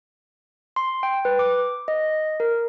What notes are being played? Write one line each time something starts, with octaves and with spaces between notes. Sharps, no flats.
C6
G5
B4
D6
D#5
A#4